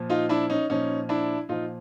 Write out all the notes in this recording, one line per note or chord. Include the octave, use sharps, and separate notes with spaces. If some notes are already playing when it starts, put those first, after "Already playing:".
Already playing: A#2 F3
D#4 F4
D4 E4
C#4 D#4
A#2 F3 C#4 D#4
D4 E4
A#2 F3 D#4 F4